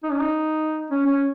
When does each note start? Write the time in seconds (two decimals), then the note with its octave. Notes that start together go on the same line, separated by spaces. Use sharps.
0.03 D#4
0.11 C#4
0.19 D#4
0.90 C#4
1.06 C#4